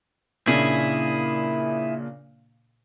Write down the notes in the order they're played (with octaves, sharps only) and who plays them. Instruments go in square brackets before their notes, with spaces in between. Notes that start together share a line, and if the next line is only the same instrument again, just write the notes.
[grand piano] A#2 C#3 D4 [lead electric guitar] E4 G#4